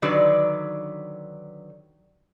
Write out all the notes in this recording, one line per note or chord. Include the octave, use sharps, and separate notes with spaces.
D3 D#3 F#3 B4 D5